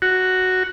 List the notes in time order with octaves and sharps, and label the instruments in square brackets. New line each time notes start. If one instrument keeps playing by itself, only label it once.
[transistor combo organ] F#4